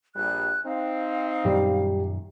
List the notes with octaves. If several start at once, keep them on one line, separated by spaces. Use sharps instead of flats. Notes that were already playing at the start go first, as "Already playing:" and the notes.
A#1 G3 F#6
C4 D#4 F5
F#2 A#2 D#3 G3